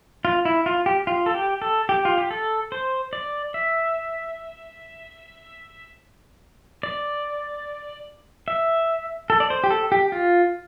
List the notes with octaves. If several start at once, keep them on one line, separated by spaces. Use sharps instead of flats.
F4
E4
F4
G4
F4
A4
G4
A4
G4
F4
G4
A4
C5
D5
E5
D5
E5
A4
D5
C5
G4
A4
G4
F4